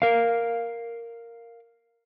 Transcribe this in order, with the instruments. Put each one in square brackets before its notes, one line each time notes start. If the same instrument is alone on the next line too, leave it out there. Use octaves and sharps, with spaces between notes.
[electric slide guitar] A#4 F5